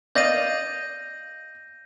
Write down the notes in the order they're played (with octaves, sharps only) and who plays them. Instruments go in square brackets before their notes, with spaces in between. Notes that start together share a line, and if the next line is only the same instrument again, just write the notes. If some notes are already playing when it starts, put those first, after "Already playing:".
[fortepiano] D5 D#5 F5 [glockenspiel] G6 A#6 D#7